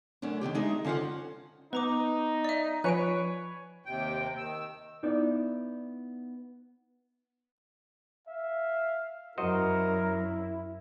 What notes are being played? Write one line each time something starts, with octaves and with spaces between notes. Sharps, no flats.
F#2 A3 C#4 D4
D3 D#3 A3 G4
G#3 D4 D#4 E5
D3 C#4 F4 C5 F#5
B3 D#4 B4 A#5 D6
D5 E5
F3 B4 C#5 G#5 F#6 C#7 D7
D#2 C3 G5
D#3 E6
B3 D#4 E4 D5
E5 F5
F#2 E4 F#4 A#4 C5 D#5